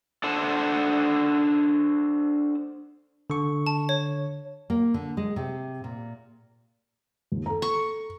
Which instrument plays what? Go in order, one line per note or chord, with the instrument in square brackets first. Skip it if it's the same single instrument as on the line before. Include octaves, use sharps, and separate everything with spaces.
[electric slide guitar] D4 A4 C5 F#5 A5
[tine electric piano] D3 C#6
[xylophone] A5
C#5
[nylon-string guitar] A#3
D3
G#3
C3
A#2
[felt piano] D#2
A4 A#5
[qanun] C#6